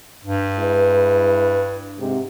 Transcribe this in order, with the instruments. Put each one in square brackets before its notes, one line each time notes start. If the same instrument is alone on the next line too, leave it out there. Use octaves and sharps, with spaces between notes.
[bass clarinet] G2
[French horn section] G#3 E4 B4
G#2 C3